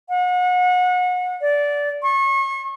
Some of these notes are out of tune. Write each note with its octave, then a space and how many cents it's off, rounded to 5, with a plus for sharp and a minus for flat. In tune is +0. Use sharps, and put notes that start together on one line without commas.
F#5 -35
D5 -15
C#6 -35